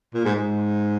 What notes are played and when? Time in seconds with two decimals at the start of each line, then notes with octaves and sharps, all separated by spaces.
0.14 A#2
0.25 G#2
0.35 G#2